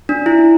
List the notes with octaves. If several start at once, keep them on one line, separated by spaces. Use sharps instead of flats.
D4
E4